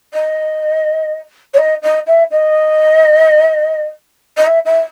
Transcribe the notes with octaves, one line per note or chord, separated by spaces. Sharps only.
D#5
C#5
D#5
D#5
E5
D#5
D#5
E5
E5